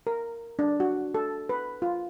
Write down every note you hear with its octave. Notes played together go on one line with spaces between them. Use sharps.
A#4
D4
F#4
A4
B4
F4